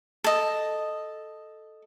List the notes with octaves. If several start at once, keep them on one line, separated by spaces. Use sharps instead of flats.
A4 D#5